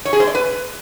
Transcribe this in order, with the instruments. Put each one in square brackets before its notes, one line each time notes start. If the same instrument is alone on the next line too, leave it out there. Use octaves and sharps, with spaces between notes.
[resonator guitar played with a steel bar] C#5
G#4
C5
D5
B4